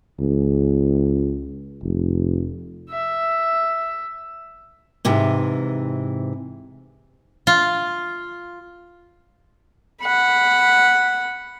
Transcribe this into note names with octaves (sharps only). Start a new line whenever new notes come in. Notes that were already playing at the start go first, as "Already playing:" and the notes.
C#2
F1
E5
G#2 C3 E3
F4
F#5 B5